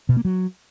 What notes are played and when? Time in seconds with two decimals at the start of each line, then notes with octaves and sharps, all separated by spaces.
0.09 B2
0.17 A#3
0.25 F#3